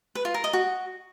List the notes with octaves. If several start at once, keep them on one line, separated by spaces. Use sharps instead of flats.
B4
F4
A#4
D#5
F#4